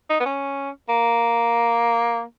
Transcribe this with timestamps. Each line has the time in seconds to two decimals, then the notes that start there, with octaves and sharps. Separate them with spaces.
0.10 D#4
0.20 B3
0.25 C#4
0.89 A#3